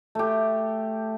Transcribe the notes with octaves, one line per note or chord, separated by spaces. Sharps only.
A3 G4